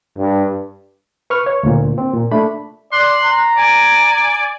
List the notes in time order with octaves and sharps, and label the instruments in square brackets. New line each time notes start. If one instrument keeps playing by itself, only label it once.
[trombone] G2
[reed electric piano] B4 C#6 F6
C#5
D2 A#2
C4
A#2
A3 D4 B5
[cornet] D5 [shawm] C6 [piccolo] F#6
[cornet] A#5
[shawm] D5 [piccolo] G#5